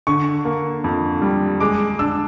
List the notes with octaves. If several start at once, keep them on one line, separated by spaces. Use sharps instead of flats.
D3 C#6
A#3
F2
G3
G#3 D6
D4 E6